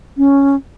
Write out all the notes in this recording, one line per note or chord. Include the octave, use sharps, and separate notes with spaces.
C#4